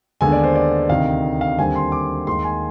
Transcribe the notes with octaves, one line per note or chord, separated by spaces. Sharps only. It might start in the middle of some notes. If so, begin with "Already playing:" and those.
D#2 D3 G#3 B3 G#5
D5
C5
D5
D2 C3 D#3 F5
F5
D#2 D3 G3 C4 G#5
C6
D6
D#2 D#3 G#3 C6
G#5